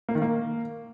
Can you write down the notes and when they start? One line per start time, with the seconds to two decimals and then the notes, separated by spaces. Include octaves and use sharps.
0.09 A#3
0.15 D#3
0.22 A#3